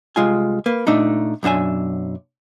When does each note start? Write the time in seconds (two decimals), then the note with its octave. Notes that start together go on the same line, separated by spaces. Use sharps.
0.16 C2 G#3 F4 G#5
0.66 A#3 B4
0.87 A#2 A3 D4 D#4
1.43 B1 F#2 D4 E5 G#5